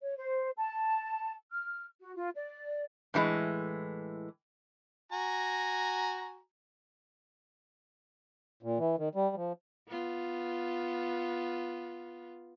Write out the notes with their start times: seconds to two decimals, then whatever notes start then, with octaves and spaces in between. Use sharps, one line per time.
0.02 C#5
0.17 C5
0.57 A5
1.51 F6
2.00 F#4
2.16 F4
2.36 D5
3.14 A2 E3 G3 G#3
5.12 F#4 G#5 A#5
8.63 A#2
8.79 E3
8.99 D#3
9.15 G3
9.36 F3
9.88 B3 F4